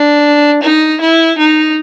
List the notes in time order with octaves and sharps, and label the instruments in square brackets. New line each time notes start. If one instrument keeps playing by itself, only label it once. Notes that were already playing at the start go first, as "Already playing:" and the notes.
Already playing: [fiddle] D4
D#4
E4
D#4